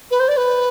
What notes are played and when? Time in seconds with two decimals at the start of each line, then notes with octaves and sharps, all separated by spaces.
0.11 B4
0.20 C5
0.28 D5
0.37 B4